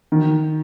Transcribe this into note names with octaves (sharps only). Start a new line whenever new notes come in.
D#3